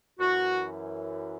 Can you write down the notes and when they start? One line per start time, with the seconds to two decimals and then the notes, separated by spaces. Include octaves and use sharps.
0.19 F#2 E3 F#4